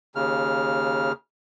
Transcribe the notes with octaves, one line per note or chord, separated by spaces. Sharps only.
D#2 C#3 F6